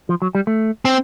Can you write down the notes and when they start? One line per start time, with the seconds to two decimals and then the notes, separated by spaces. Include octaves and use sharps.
0.09 F3
0.22 F#3
0.35 G3
0.47 A3
0.85 C4